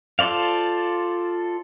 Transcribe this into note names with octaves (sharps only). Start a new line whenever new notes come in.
F4 A4 C5 D5 F5